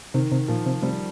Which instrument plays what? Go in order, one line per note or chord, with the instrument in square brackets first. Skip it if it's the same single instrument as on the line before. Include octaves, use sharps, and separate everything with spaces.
[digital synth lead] C3 [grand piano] D#3
[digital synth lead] C3
[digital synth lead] A#2 [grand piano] F3
[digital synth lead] C3
[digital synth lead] C3 [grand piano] G3